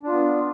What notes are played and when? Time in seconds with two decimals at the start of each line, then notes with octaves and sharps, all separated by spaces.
0.03 D4
0.08 F4
0.12 B3